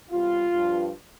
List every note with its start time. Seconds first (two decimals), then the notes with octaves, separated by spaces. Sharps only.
0.10 E2 C3 G3 F4
0.54 G2 F3